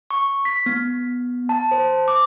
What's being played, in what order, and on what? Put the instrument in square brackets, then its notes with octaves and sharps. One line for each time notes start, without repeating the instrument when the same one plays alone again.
[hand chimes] C#6
B6
B3
A5
C5
D6